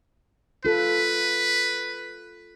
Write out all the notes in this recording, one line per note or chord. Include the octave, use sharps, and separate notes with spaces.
F4 A4 B4